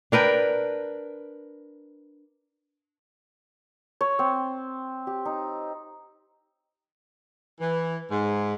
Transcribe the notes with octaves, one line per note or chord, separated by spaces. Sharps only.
D4 A#4 B4 G5
C#5
C4
G4
D#4
E3
G#2